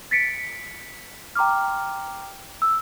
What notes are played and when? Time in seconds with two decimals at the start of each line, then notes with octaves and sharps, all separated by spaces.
0.11 A6 B6 C#7 D7
1.35 G5 A#5 C6 D6 F6
2.62 E6